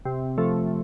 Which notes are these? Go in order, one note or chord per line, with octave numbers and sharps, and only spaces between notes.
C3
F3 A3